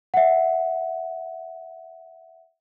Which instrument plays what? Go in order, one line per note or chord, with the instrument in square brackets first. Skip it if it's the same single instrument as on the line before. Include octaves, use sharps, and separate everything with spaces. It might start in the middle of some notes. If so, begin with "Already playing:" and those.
[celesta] E5 F#5